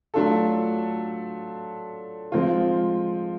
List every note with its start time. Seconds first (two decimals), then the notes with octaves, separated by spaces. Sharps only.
0.14 F#3 A3 D4 F4 A4
2.32 F3 G#3 C4 F4